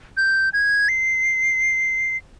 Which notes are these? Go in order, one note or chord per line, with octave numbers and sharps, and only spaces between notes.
G6
G#6
C7